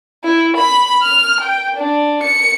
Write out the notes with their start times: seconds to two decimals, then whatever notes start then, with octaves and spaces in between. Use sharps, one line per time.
0.24 E4
0.57 B5
1.03 F6
1.41 G5
1.77 D4
2.23 C#7